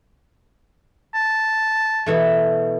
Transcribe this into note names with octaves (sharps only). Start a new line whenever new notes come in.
A5
B2 E3 A3